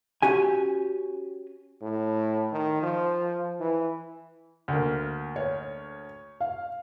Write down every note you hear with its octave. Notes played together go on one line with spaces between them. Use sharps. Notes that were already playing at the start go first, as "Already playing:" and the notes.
C#4 F#4 G4 G#5
A2
D#3
F3
E3
D2 A#3
C#5
F5